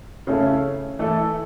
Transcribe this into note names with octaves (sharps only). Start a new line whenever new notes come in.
C#3 A3 C#4 E4 A4
E3 A3 E4 A4